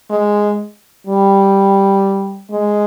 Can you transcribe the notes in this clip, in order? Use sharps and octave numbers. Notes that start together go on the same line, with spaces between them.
G#3
G3
G#3